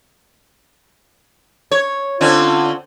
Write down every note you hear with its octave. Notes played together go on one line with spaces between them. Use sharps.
C#5
D3 C4 C#4 F4